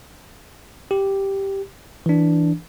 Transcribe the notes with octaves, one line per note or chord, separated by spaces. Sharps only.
G4
E3 D4